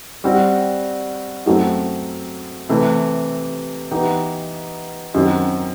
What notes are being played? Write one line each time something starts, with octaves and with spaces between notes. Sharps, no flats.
G3 C4 F#4
F#2 F#3 A3 C4
C3 E3 A3
E3 B3 D#4 G4
F#2 D#3 F#3 C4